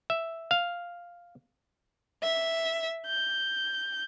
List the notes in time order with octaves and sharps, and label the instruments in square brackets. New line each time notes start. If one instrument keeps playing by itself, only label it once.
[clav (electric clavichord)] E5
F5
[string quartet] E5
G6